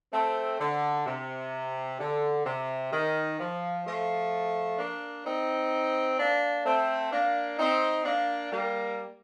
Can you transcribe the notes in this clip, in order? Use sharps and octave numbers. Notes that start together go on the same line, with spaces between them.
A3 C4
D3
C3
D3
C3
D#3
F3
F3 A3
A#3 D4
C4 D#4
A#3 D4
A3 C4
A#3 D4
C4 D#4
A#3 D4
G3 A#3